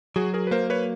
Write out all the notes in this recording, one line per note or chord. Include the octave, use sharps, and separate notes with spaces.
F#3 F#4 G#4
G#4 A#4
B4
A#3 A#4 C5
B4 C#5